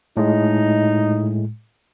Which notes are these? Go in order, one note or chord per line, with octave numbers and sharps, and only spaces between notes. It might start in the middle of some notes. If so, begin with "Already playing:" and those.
A2 G#3 D#4